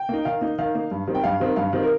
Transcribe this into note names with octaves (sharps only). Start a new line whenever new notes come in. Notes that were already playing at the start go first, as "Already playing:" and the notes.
Already playing: G5
A#3 D#4
D#3 F5
A#3 D#4
D#3 F5
A#3 D#4
G2
D#3 G3 C4
G5
G2 F5
D#3 G3 C4
G2 F5
D#3 G3 C4
A#4